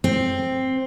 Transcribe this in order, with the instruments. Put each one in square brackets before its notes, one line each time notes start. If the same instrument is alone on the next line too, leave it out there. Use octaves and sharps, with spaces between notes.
[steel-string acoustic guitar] C4